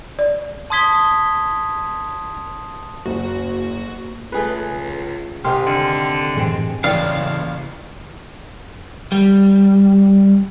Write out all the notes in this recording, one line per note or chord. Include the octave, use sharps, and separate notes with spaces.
D5
A5 C6 D#6 G#6 B6 G7
F#1 F#4
C#2 A3 G#4 B4
G#2 C3 D#3 G5 C6 F6
D3
F#2 A2 E3 G#3 C4
A1 C#3 A#3 D5 F5 G5
G3